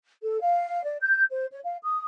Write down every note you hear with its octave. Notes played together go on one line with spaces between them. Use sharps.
A4
F5
D5
G6
C5
C#5
F5
D#6